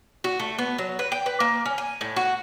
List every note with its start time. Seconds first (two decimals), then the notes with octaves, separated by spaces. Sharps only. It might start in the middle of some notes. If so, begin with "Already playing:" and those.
0.24 F#4
0.39 A3
0.58 B3
0.78 F#3
0.99 B4
1.12 G5
1.26 B4
1.40 A#3
1.66 C#4
1.78 G#5
2.01 A2
2.16 F#4